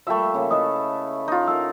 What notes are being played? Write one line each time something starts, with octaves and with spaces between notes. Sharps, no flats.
F3 G3 A3 A#3 E5
C#3 A#3
E4 A4 B4 D#5 D#6
D#4 F4
A4 A#4 F#5 E6